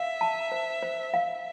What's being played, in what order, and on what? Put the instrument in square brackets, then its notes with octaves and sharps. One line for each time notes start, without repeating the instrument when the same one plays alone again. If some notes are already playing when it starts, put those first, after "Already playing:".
Already playing: [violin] E5 [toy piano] F5
[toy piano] A5
C5
C5
F5